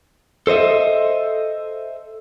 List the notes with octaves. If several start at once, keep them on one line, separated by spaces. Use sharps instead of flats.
A4 C5 D#5 E5